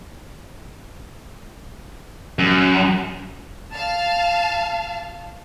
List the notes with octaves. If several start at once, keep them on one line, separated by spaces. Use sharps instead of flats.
F#2
F5 A5